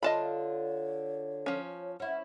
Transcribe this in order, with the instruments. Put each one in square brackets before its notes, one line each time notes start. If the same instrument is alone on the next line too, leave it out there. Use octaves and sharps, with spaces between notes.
[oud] D3 F4 F5 [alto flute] C#5 [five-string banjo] D#5 A5 B5
[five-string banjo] F3 C#4
[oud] C#4 E4 [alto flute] F#5